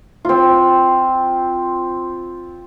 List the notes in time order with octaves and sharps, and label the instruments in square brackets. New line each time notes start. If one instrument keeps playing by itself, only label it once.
[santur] C4 F4